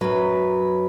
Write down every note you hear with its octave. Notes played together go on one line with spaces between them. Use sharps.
F#2 F#3 B4